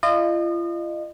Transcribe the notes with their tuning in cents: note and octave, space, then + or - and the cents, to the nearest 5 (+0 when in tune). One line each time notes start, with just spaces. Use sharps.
F4 -40 D#5 -35